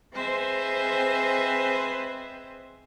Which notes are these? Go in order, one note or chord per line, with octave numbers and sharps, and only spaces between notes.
C4 G#4 B4 C5 D#5 E5